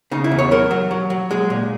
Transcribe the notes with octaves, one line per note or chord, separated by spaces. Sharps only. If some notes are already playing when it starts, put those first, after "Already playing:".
C#3 D#4
E4
E2
C#5
F#3 A#4
F#3
F#3
F#3
G#3 G#4
A#2